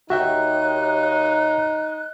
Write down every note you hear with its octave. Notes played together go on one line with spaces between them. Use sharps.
D#2 D#4 F#4 C#5 E5 G5 F#6